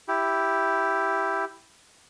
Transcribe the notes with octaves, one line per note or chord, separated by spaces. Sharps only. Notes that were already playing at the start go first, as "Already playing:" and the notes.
E4 G4